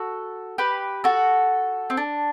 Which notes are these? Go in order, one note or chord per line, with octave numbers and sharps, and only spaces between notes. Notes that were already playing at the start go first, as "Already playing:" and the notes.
Already playing: F#4 A4
G4 B4
F#4 A4
C4
D4